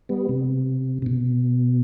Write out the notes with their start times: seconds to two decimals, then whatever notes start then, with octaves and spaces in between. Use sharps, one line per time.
0.09 G3 B3
0.29 C3
1.02 C3
1.06 B2